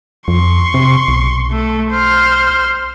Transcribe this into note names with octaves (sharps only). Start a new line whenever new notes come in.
F2 C6 C#6
C3
B1
A3 A4
C5 F6